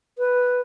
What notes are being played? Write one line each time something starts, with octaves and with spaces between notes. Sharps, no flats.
B4